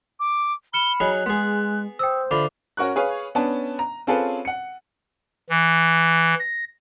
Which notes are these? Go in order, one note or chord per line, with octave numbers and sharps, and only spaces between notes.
D6
B5 F6 C#7 E7 G7
F#3 D#4 G#4 F#6
G#3 B3 G#4 C6
C5 G5 D#6 E6
D3 F4 E5 B5 D6
C#4 F#4 A#4 C#6 F#6
G#4 B4 C#5 F5
B3 C#4 D4 A5
A#5
C4 C#4 F4 G#4 A4 B4
F#5 C#7
E3
A#6